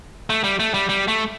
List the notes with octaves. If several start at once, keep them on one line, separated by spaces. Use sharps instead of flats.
A3
G3
A3
G3
G3
A3